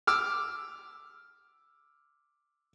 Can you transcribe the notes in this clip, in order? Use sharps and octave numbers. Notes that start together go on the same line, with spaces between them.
D6 E6 F6